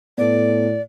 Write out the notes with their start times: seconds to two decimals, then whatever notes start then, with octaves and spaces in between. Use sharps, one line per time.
0.18 A2 B3 A4 D5